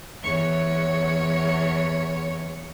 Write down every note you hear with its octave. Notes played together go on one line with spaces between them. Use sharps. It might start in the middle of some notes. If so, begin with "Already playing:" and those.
E2 C#5